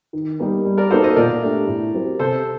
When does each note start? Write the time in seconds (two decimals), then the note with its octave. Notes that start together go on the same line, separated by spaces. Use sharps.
0.13 D#3
0.39 G3 A#3 D#4 G4
0.65 G3
0.78 A#4 D5
0.91 A#3 D#4 F#4 A4 C5
1.04 C5 D#5
1.16 A#2 A#4 D5
1.42 A3 D4 G4
1.67 A2
1.94 F#3 C4 G4 A#4
2.19 C3 A4 C5